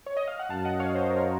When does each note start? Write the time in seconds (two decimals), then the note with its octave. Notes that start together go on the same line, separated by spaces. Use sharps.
0.06 C#5
0.17 D#5
0.28 F5
0.39 F#5
0.50 F#2 F5 A5
0.65 D#5 F#5
0.80 C#5 F5
0.95 C5 D#5
1.10 A#4 C#5